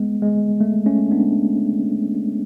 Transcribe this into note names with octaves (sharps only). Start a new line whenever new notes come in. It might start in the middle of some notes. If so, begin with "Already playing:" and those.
Already playing: G#3 B3
G#3
A3
A3 C#4
B3 D4